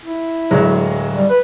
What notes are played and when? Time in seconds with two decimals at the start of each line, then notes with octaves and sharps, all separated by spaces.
0.06 E4
0.51 D1 F#3 G#3
1.16 G3
1.30 B4